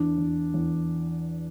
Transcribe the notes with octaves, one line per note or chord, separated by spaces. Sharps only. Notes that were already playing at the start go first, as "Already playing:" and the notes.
Already playing: E2 D4
E2
E2